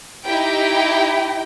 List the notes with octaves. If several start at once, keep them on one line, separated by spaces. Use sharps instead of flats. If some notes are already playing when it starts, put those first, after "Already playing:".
D#4 E4 G4 G5